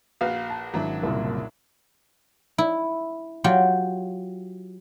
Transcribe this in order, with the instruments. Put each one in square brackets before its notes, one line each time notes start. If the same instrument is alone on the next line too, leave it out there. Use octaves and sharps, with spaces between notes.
[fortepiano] A#1 F#4 B4 [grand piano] F5
[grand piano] A5
[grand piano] G#1 [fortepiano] F#3 D4 E4
[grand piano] F#1 C2 A#2
[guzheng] E4
F#3 F4 G4